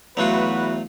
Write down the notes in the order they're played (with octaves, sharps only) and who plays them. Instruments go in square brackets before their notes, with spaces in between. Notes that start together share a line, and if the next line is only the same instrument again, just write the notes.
[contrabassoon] E2 [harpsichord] F#3 A3 F4 [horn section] F#4 B4